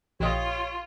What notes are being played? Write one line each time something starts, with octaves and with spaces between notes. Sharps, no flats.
A#1 F4 G4 C#5 D#5